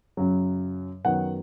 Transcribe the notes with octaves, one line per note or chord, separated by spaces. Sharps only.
F#2 C#3 F#3
F#2 D#3 F#3 B3 F#5